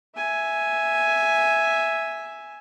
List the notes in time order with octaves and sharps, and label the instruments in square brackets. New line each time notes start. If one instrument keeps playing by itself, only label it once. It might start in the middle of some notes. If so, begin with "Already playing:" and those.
[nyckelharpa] E5 G#5